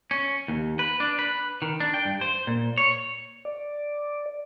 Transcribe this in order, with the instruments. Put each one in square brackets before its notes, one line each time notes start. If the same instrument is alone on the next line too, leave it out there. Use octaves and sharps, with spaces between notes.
[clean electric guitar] C#4
D#2
B4
D4
B4
D#3
D4
G5
G2
C5
A#2
C#5
[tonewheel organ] D5